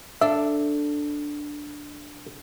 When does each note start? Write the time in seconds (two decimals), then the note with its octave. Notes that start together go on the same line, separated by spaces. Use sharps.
0.21 D4 A4 E5